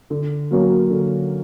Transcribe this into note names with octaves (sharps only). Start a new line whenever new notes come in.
D3
F#3 A#3 C#4 F#4
D3